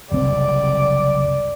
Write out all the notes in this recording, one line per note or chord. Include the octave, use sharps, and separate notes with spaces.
F#1 C2 C4 D5